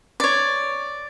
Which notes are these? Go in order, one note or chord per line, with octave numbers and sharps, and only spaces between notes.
C#5 D5